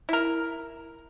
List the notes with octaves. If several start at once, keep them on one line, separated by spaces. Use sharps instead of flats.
E4 A#4